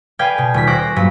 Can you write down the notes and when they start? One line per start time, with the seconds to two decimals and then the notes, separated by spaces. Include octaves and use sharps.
0.19 B4 D5 F5 G5 G#5
0.38 B2
0.54 D#1 B6
0.67 C5 C#6 D6 F#6 A#6
0.82 A#6
0.96 G2 A#2 F#3 B5